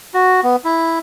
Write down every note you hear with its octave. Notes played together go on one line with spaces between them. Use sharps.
F#4
B3
E4